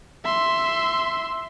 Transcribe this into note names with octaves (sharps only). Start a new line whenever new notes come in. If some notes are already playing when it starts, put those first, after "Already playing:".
E5 C6